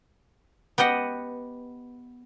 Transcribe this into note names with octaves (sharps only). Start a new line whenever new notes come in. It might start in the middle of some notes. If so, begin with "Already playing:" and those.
B3 G4 D#5 F#5